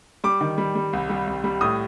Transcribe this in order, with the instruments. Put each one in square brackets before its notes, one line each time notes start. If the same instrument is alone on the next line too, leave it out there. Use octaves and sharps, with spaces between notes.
[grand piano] G3 D6
D#3
G3
G3
C2
G3
C2
G3
A2 D#6